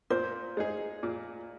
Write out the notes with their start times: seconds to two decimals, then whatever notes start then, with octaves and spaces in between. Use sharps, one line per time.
0.10 A#2 C5
0.57 G#3 D#4 G#4
1.03 A#2